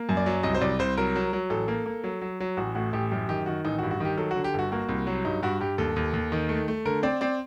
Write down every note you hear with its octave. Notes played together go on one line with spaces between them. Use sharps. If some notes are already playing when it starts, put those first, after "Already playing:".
Already playing: A#3
F#2
D5
F#3
C2 D#5
C5
C2 D5
C2 C5
F#3 A#4
F#3
F#3
A1 A4
A#3
A#3
F#3
F#3
F#3
A1 F#4
A2 F#4
A1 G4
F#2 G4
D#3 G4
D#3 F#4
A1 D#4
F#4
G2
F#4
D#3 G4
F#3 A4
F#4
D3
G4
G1 F#4
A#3 F#4
C2
F#3
G2 D#4
G2 F#4
G2 G4
D#2 A4
D#2
D#2
D#3
A3
A3
D3 A#4
C4 D5
C4 D5